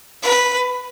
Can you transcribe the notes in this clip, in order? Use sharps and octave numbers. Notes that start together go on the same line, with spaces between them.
B4